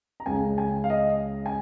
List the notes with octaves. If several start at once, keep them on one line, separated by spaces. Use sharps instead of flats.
A#5
C#2 C#3 G#3 G#5
G#5
F5
D#5
G#5